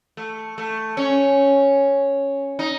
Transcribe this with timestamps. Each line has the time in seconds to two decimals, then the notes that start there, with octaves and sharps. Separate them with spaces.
0.17 A3
0.58 A3
0.97 C#4
2.59 D#4